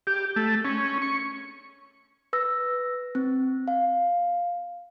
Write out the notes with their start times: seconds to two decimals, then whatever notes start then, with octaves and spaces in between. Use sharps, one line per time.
0.07 G4
0.36 A3
0.65 C#4
1.02 C#6
2.33 B4 E6 A#6
3.15 C4
3.68 F5